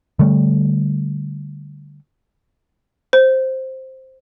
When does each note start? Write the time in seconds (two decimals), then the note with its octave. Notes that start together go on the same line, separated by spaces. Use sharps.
0.19 D3 G3 A3
3.13 C5